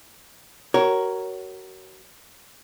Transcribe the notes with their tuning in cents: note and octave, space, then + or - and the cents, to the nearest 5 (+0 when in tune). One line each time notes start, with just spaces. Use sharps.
F#4 +30 A#4 +0 C#5 +0